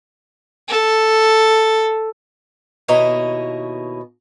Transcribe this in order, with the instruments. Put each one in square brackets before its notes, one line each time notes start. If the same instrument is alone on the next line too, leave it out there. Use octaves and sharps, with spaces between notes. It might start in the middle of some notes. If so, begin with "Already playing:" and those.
[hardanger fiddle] A4
[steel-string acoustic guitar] D#2 B2 E4 C#5 D#5 A#5